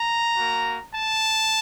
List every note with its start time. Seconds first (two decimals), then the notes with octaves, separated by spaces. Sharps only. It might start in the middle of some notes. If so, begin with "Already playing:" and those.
Already playing: A#5
0.37 A#3 F#4
0.94 A5